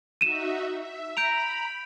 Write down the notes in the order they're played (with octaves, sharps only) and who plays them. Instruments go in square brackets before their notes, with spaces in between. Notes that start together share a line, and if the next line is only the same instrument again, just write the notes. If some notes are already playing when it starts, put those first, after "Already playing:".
[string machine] D#4 F#4 E5 [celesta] D#7 E7
[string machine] E5
[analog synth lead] A#5 [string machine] B5 [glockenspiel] G6 D7 F7